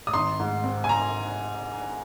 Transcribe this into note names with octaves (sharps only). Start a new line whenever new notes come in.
D#6
G#1 C6
G#2
C4
G#5
A#5